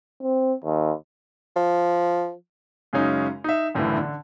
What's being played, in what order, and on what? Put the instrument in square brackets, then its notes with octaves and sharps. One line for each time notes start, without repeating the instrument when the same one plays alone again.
[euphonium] C4
D#2
[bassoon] F3
[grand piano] F#2 C#3 G#3 C#4 D#4
D#4 E5
F#1 A2 D3 E3
D3